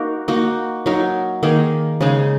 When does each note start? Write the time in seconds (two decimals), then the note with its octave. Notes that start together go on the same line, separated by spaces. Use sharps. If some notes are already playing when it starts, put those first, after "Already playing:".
Already playing: A#3 D#4 F#4 A#4
0.28 A#3 D#4 F#4
0.86 F#3 D#4 A#4
1.43 D#3 A#3 D#4 G#4
2.01 C#3 G#3 D#4